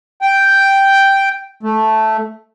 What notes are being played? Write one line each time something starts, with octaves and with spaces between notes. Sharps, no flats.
G5
A3